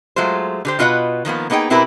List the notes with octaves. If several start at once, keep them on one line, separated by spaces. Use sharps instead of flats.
F#3 G#3 A3 F4 C5
D3 G4 C5
B2 F4 B4 D#5 E5 F#5
D#3 F3 A#3 B3
A#3 B3 D#4 G#4 G5
B2 C4 E4 G4 A#4 B4